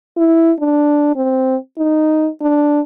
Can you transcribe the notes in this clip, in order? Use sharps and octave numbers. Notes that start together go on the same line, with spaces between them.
E4
D4
C4
D#4
D4